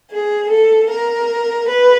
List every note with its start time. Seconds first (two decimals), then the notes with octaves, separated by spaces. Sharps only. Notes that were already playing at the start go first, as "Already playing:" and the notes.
0.10 G#4
0.49 A4
0.89 A#4
1.68 B4